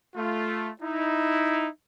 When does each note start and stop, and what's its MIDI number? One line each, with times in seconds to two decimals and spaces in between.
0.15 0.70 57
0.15 0.70 65
0.82 1.67 63
0.82 1.67 64